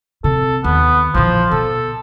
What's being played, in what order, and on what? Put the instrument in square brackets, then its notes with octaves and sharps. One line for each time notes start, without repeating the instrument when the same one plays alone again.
[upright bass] C3 [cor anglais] A4
[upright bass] D#2 [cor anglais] B3
[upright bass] A#1 E3 [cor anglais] F3
[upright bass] B2 [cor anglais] A4